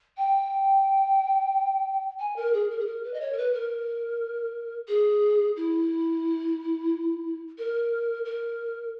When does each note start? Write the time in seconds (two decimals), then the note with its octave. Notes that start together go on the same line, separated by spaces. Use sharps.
0.17 G5
2.20 G#5
2.36 A#4
2.53 G#4
2.70 A#4
2.79 G#4
2.87 A#4
3.03 B4
3.13 D#5
3.21 C#5
3.33 A#4
3.37 B4
3.53 A#4
4.88 G#4
5.56 E4
7.58 A#4
8.25 A#4